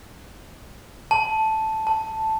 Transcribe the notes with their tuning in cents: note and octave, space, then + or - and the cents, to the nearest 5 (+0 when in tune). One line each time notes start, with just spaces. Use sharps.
A5 -5
A5 +0